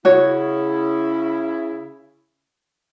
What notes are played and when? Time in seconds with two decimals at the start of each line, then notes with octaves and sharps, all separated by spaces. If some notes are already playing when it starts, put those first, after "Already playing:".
0.05 C#3 E4 F#4 C#5